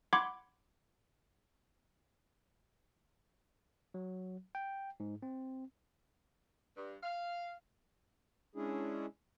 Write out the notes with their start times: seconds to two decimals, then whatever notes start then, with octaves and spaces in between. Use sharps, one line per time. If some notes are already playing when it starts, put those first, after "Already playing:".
0.13 F#5 B5 C6 D6 G#6
3.94 F#3
4.55 G5
5.00 G#2
5.22 C4
6.76 G2
7.03 F5
8.55 G#3 C#4 D4 E4 G#4